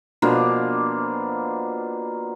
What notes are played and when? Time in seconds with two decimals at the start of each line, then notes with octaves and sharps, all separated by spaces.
0.22 B2 F3 A#3 D4